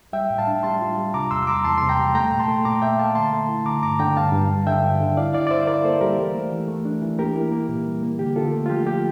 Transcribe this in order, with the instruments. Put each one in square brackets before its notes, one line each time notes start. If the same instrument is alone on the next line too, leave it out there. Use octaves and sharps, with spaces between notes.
[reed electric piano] G3 E5 G5
A2
F5 A5
D4
G3 A5 C6
F4
G3
C3 A#5 D6
E2 C6 E6
E6
G3 A#5 D6
E2 A5 C6
C3 C6
G5 A#5
G3
A3 G5 A#5
A#2
A5 C6
A3
A#2 A#5 D6
A#2 E5 G5
A3 F5 A5
D3 A5 C6
A3
E4
D3 A#5 D6
G2 A#5 D6
D3 G5 A#5
G2 F5 A5
G2
G3
D3 E5 G5
G2
D3
E4 D5 F5
E4 D5 F5
D5
G3 C5 E5
E4 A#4 D5
A#3 A4 C5
G3 G4 A#4
E3
A3
E3
A3
D4
E3
A#3 G4 A#4
E4
A#3
A#2
G3
A#3
D3 G4
D3 F4 A4
A3
F4
F3 G4
G4